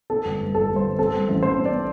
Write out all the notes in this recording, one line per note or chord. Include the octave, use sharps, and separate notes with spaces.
C4 A4
G1
G2
G1 A4
G2
C5
G1
C4 A4
G2
A1
A1 C5
C4
D5
C4